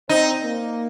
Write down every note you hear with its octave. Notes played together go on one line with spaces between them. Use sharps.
C4 D#4
A#3